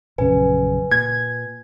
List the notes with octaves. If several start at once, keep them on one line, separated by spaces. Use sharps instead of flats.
A#1 F#2 C#3 B4 G#5
A#2 G#6